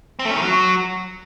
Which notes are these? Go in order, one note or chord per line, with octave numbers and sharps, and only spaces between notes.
C4
A3
C#4
D#3
F#3